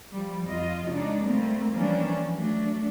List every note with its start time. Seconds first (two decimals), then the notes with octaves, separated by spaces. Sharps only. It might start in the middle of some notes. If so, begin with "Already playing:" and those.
0.12 F3 G3
0.45 F2 F4 D#5
0.88 C#3 G#3 D4 D#4
1.25 G3 A3 A#3 C4
1.74 E3 F3 G3 A#3 C#4 D4
2.34 F#3 A3 D4